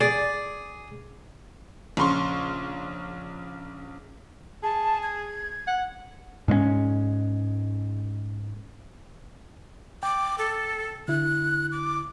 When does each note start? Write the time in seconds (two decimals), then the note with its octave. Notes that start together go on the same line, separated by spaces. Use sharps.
0.01 G#4 D5
1.97 A#1 C#3 C6 C#6
4.63 G#4 A5
5.03 G#6
5.67 F#5
6.48 G#2 G#3 A3 C#4
10.03 G5 D6
10.38 A4
11.08 D3 E4 F#6
11.72 D6